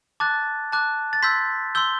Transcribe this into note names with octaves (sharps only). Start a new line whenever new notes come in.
A5 D6 F#6 A6
A5 D6 F#6
A6
C6 E6 G6 B6
C6 E6 G6 G7